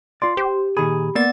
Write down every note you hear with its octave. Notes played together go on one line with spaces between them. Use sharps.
F4 D5 C6
G4 C5
A#2 D#3 G#4 B5
A#3 B3 D5 A6